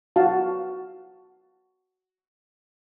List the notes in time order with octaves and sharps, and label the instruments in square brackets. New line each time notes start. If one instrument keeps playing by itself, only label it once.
[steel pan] F#4 F5 A5